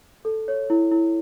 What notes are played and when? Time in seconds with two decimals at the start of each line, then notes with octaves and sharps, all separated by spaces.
0.25 A4
0.48 C#5
0.70 E4
0.92 E4